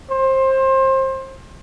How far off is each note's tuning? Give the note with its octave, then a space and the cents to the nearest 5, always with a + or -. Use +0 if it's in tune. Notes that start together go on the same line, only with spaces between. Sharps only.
C5 +25